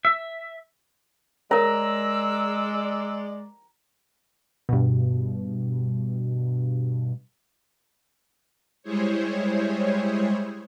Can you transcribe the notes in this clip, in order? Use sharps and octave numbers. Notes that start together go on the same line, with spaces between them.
E5
G#3 A#4 C#5 D5 A#5 E6
G2 B2
G3 G#3 E4 G#4 C5 C#5